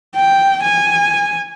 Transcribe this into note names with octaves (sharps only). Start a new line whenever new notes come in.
G5
G#5